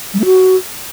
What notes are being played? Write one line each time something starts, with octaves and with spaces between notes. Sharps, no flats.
G3
A3
F#4